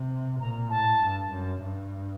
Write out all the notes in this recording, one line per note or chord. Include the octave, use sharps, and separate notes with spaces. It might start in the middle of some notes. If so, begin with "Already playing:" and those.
Already playing: C3
A#2 A#5
A2 A5
G2
F#2
G2